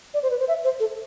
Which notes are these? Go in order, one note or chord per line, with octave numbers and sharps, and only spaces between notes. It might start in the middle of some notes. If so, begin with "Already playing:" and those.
D5
C5
B4
C5
E5
C5
A4